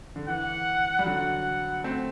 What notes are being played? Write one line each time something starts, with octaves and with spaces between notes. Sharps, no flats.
D3
E3 F#5
G3
D3 F#3 F#5
A3 C4